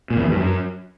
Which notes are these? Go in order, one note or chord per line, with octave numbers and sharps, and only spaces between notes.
A#2
E2
E3
G2
F#2